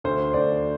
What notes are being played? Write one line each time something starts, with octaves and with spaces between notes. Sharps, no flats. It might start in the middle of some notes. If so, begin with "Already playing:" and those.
D2 C5
D2 D5